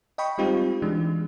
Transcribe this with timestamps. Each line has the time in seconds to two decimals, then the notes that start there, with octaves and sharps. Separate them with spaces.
0.18 D#5 G5 B5 C#6
0.38 G3 G#3 C4 D#4 F4 G4
0.82 E3 G#3 D4